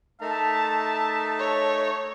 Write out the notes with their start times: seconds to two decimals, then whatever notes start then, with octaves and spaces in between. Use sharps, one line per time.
0.21 A3 D#4 A#4 E5 A5
1.39 C#5